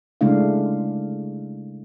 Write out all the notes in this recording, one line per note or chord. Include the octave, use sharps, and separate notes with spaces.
C#3 G#3 A3 D4 E4 F5